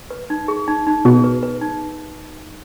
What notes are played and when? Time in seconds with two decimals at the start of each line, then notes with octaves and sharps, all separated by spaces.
0.10 B4
0.30 D#4
0.48 G#4
0.68 D#4
0.87 D#4
1.05 B2 G#4
1.24 B4
1.43 B4
1.61 D#4